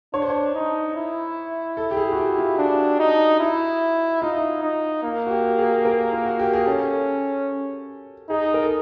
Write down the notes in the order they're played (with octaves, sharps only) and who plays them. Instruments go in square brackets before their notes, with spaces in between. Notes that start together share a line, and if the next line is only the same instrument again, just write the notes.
[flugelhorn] D4 [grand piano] C#5
[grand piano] C5
C#5
[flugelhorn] D#4
E4
[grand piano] A4
G4
G#4
F#4
G4
F4
[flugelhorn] D4 [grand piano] F#4
[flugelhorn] D#4
E4
[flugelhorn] D#4 [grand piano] F4
[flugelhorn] D#4
A#3
[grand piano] F#4
G4
G#4
A#4
F4
F#4
G4
G#4
[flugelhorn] C#4 [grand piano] A4
[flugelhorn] D#4 [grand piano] G#4
[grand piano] A#4
A4